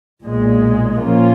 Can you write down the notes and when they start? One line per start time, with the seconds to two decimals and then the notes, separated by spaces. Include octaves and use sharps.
0.22 B1 A#2 G#3
0.99 A#2 F3 A#3 C#4 F4